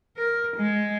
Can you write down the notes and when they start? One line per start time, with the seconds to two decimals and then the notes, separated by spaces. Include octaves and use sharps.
0.17 A#4
0.57 G#3